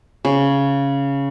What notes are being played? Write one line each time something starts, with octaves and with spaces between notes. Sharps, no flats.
C#3